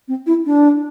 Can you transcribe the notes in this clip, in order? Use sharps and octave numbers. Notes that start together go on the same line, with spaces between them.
C4
E4
D4